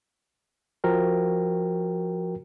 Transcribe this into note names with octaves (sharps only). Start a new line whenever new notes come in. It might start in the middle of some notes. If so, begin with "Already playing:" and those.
F3 F#4 A#4 G5